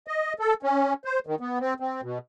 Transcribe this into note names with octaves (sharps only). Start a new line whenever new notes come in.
D#5
A4
C#4
C5
D#3
B3
C4
C4
B2